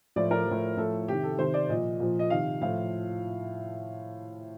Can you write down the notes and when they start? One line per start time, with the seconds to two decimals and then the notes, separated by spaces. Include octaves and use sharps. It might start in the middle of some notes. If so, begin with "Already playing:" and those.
0.16 A2 F3 D5
0.31 A#4
0.46 A2 F3
0.77 A2 F3 A4
1.08 C3 D#3 G4
1.23 A4
1.38 C3 D#3 C5
1.54 D5
1.69 A#2 F3 D#5
2.00 A#2 F3
2.19 D#5
2.30 C3 D#3 F5
2.61 A2 F3 F5